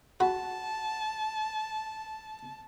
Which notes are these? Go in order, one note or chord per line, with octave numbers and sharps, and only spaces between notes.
F#4 A5 B5